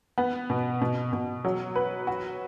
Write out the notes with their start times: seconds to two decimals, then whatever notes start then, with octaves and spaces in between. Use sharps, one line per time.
0.18 B3
0.50 B2
0.82 B2
1.13 B2
1.45 F#3
1.76 B4
2.07 F#4